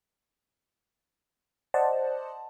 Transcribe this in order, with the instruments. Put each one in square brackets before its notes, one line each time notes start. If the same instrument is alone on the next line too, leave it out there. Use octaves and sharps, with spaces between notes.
[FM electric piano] C5 D5 D#5 F#5 A5